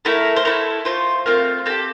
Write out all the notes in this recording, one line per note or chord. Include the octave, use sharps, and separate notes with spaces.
A3 E4 A4 A#4
C5
A3 E4 A4 A#4
A3 C4 F4 C5
A3 C4 F4 A#4
C4 G4 A4